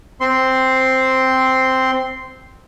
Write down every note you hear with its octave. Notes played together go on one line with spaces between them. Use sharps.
C4 C6